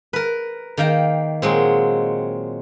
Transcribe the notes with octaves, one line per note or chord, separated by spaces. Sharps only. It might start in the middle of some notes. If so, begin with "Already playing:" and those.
A#4 B4
D#3 A#3 F5 G5 A#5
A#2 F#3 G#3 C4